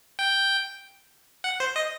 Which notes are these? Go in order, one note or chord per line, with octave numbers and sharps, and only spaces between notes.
G5
F#5
C5
D#5